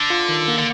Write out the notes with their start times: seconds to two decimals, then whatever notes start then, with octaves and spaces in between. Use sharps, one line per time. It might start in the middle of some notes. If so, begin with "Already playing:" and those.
Already playing: D3
0.10 F4
0.29 D#3
0.48 A#3
0.58 D3